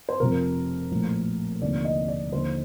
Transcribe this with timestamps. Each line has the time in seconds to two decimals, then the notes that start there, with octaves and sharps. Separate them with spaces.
0.09 C5
0.20 F1 F2 C3 F3 A#4
0.91 A#1 A2 F3
1.61 F1 D#2 D3 F3 D5
1.85 D#5
2.08 D5
2.33 D#2 D3 F3 C5